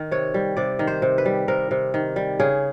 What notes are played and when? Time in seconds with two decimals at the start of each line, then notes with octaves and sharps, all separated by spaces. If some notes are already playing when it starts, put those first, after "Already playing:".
Already playing: D#3
0.11 C3 C#5
0.34 G3
0.57 C3 D5
0.79 D#3
0.87 C5
1.02 C3
1.18 B4
1.26 G3
1.48 C3 A#4
1.71 C3
1.94 D#3
2.16 G3
2.40 C#3 G#4